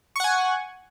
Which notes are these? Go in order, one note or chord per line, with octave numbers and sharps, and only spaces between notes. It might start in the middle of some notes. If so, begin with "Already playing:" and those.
F#5 G#5 C#6